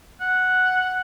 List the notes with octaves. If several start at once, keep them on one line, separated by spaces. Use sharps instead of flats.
F#5